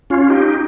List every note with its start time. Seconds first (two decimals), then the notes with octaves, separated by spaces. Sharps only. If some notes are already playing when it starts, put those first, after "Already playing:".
0.10 C#4 F4
0.30 D#4 G4